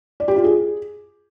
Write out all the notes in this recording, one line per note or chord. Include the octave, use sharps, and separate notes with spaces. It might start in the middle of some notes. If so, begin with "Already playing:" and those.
D5
G4
F4
G#4